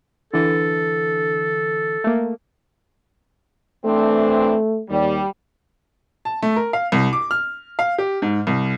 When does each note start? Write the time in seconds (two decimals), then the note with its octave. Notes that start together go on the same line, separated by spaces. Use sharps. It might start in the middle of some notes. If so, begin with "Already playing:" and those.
0.33 D3 E3 A4
2.04 A3 A#3
3.85 E3 A3 C4 D4
4.90 D#2 G3
6.25 A5
6.42 A3
6.56 A#4
6.73 F5
6.92 C2
7.13 D6
7.31 F6
7.79 F5
7.98 G4
8.22 G#2
8.47 C2